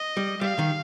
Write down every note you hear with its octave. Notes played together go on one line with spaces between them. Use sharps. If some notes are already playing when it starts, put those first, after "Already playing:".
Already playing: D#5
G3
G3 F5
D#3